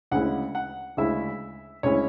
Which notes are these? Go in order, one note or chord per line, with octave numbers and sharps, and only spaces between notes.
D2 C#3 G#3 C#4 E4 F#5
F#5
D2 C#3 G#3 C#4 E4 E5
D2 C#3 G#3 C#4 E4 C#5